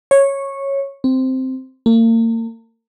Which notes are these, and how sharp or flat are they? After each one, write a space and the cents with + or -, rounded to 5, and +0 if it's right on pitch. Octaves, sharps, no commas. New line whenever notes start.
C#5 -10
C4 -5
A#3 -40